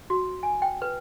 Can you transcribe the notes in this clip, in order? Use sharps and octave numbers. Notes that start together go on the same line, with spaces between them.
F#4
G#5
G5
B4